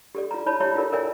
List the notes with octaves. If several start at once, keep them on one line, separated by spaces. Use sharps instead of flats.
G4 A4 D5
F4 A#5
E4 C#5 D5 A5 B5
G4 C#5 E5 A#5
E4 F4 G4 A4 A#4 D5
A4 A#4 D5 E5 G5 G#5